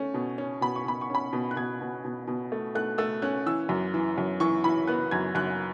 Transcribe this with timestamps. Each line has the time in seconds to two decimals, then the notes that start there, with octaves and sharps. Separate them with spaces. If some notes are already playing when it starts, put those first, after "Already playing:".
Already playing: A3 C#4
0.14 B2
0.38 C#4
0.61 B2 B5
0.75 C#6
0.85 B2 B5
1.01 C#6
1.10 C#4 B5
1.33 B2
1.51 F#6
1.56 B2 G#6
1.81 B2
2.04 B2
2.27 B2
2.52 A3
2.75 A3 F#6
2.98 A3 E6
3.22 C#4 F#6
3.46 E3 E6
3.69 F#2
3.94 E3
4.18 F#2
4.40 E3 C#6
4.64 E3 B5
4.87 B3 F#6
5.11 F#2 G#6
5.35 F#2 F#6